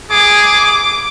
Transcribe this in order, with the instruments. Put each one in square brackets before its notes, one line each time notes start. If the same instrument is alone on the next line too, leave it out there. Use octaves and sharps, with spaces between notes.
[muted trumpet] G#4 [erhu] D6